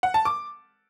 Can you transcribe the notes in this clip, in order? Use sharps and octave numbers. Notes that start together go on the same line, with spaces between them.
F#5
A5
D6